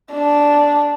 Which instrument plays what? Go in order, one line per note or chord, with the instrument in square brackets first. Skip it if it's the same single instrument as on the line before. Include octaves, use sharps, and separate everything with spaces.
[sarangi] D4